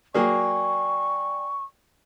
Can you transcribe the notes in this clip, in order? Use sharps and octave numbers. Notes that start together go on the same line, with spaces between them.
F#3 A#3 G#4 D5 G5 G#5 C#6